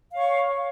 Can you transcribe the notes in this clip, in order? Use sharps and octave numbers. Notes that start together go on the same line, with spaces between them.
C#5 F5 C#6